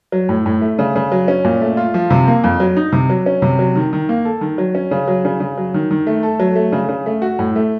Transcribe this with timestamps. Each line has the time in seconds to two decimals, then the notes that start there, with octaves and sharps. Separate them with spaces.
0.12 F#3
0.29 A2
0.46 A2
0.61 A3
0.79 C#3
0.96 C#3
1.12 F#3
1.28 C#4
1.45 A#2
1.61 A3
1.77 F4
1.94 F3
2.10 C3
2.27 A#3
2.44 F2
2.60 F#3
2.77 D#4
2.92 C3
3.10 F#3
3.26 C#4
3.42 C3
3.59 F#3
3.75 D#3
3.93 D#3
4.09 A#3
4.25 A4
4.41 D#3
4.58 F#3
4.75 C#4
4.91 C#3
5.08 F#3
5.25 C#3
5.40 C#3
5.58 F#3
5.74 D#3
5.91 D#3
6.07 A3
6.23 A4
6.40 F#3
6.56 A3
6.72 C#3
6.89 C#3
7.06 A3
7.22 F#4
7.39 A2
7.56 A3